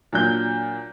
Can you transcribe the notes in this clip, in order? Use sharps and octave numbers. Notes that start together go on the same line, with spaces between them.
A#2 F#3 D4 G6